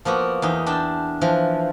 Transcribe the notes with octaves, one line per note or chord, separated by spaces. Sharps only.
F3 A#3 B3 F#4
E2 D#4
D4 G5 A5
E3 F3